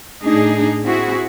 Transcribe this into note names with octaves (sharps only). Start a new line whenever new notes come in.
A2 D4 D#4 G#4
C4 E4 F#4 G#4